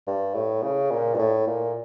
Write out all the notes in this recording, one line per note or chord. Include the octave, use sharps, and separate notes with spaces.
G2
A2
C#3
A#2
G2
A2
A#2